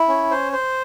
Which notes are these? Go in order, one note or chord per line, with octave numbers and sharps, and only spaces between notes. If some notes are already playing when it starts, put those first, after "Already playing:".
Already playing: E4
C#4
C5
C5